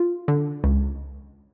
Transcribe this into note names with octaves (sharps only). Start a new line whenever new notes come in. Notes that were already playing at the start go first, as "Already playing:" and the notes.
Already playing: F4
D3
C#2